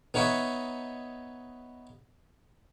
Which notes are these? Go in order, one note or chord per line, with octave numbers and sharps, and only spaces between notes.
B3 D#4 C#5 E5